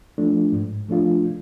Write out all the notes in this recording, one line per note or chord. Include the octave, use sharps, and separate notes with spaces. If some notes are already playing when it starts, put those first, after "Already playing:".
F3 A3 D4 F4
G#2
F3 A3 D4 F4